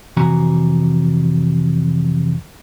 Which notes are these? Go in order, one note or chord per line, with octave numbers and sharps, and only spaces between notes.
F2 C3 E3 F#4 G#5 A#5